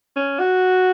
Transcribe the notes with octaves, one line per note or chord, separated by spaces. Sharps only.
C#4
F#4